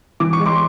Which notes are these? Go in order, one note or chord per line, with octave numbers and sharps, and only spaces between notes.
E3 D6
C#6
G#3
C6 D6